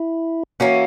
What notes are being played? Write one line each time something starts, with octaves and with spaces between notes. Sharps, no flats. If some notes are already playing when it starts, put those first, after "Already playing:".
Already playing: E4
E3 A#3 C#4 F#4